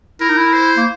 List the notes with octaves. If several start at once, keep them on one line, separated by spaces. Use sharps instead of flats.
E4 A#4
D#4
E4
C5
A#3